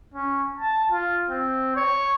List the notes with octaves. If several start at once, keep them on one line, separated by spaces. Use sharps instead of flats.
C#4
A5
F4
C4
C#5